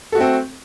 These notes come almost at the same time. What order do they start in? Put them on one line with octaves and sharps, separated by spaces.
A4 F#4 A3 C4